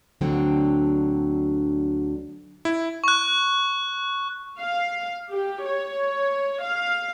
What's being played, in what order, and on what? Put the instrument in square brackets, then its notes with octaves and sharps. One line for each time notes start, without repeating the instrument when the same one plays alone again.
[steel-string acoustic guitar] D2 D3 F#3 C4 D4 G5
[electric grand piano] E4
[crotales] C#6 F#6
[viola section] F5
G4
C#5
F5